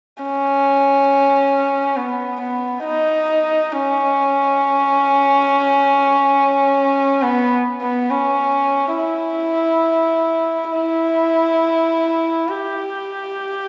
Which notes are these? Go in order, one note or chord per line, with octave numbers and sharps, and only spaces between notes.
C#4
B3
B3
D#4
C#4
B3
B3
C#4
E4
E4
G4